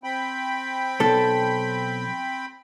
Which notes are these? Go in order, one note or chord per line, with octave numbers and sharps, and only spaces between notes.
C4 G5 B5
B1 A4